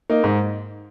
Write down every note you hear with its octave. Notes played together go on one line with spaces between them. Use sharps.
A#3 D#4
G#2